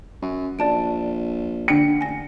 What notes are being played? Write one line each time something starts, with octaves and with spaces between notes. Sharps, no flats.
F#2
A#1 D5 A5 D7
D3 G5 C#7
A1 G#5 A#6